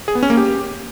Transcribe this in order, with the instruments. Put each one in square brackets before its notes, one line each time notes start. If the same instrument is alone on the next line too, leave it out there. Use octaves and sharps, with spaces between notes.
[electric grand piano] G#4
B3
C#4
A#3
G4